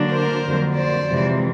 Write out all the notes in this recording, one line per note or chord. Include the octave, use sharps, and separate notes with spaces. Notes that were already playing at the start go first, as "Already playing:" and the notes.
Already playing: D3 F#3 A#3 D4
A#4 C5
F2 D3 F#3 A#3
C5 D5
F2 C3 E3 G#3